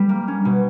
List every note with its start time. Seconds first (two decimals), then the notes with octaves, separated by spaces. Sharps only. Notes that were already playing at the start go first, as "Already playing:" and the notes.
Already playing: G3
0.09 A#3
0.28 C#4
0.45 B2